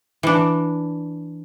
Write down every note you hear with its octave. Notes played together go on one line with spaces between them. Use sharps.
E3 D4